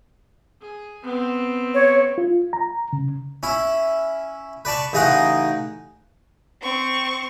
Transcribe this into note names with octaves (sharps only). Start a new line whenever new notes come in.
G#4
B3 C4
C#5
F4
A#5
C#3
C#4 E4
B4 D5 A5 C#6
A1 C#3 D#4 G#4 D#5 F#5
C4 C#6